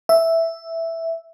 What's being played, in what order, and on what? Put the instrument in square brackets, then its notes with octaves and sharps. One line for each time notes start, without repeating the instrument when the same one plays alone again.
[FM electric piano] E5